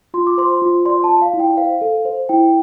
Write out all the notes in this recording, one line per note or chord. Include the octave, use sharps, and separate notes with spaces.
F4 C6
D6
C5 C6
F4
D5 C6
A5
D5
F5
E4
G5
C5 F5
A4
C5
E4 G5